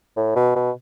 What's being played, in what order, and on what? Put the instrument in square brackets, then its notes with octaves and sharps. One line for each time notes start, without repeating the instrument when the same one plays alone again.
[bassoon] A2
B2
B2